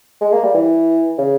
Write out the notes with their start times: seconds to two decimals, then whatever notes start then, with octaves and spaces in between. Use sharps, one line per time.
0.21 G#3
0.32 A#3
0.44 G3
0.54 E3
1.18 C#3